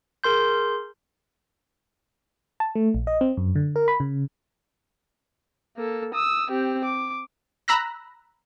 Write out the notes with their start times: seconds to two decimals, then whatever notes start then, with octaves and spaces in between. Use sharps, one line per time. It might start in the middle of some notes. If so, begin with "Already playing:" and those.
0.24 G#4 A#4 C6 G6
2.60 A5
2.75 A3
2.94 A#1
3.07 D#5
3.21 C4
3.37 F#2
3.56 D3
3.76 A#4
3.88 B5
4.00 C#3
5.77 A#3 A4
6.14 D#6 E6
6.51 C4 G4
6.85 D6
7.68 A#5 B5 E6 F#6 A#6